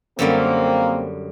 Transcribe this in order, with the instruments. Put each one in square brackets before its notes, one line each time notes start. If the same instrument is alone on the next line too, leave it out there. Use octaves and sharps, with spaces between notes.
[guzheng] F#2 D3 G3 [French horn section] A#3 C4